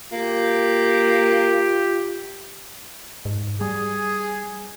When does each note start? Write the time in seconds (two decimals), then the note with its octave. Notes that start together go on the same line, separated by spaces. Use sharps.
0.13 A#3 F4 G4
3.25 G#2
3.61 G3 G#4